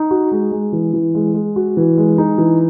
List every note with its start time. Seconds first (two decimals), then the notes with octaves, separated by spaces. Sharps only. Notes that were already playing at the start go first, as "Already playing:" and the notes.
Already playing: D#4
0.11 F#4
0.32 G#3
0.51 G#3
0.73 E3
0.93 E3
1.15 G#3
1.34 G#3
1.56 F#4
1.77 E3
1.98 G#3
2.18 D#4
2.38 E3